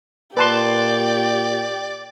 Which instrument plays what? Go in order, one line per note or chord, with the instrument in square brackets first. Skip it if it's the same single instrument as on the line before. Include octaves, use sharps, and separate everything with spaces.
[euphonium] A#2 [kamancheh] G4 G5 [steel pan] B4 A5 C6 [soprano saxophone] D5